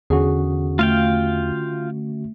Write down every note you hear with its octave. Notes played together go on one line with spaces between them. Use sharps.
E2 D3 C#4 F#4 G#4
A3 F4 F5 G5